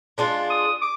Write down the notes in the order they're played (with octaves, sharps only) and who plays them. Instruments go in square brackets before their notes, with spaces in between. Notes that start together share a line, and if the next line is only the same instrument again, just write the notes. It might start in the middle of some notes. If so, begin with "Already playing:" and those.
[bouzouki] G#3 D4 F4
[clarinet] D#6
D6